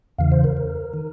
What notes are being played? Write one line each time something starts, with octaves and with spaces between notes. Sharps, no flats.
E2 C#3 E3 F5
C5
A#4
A#4
D#3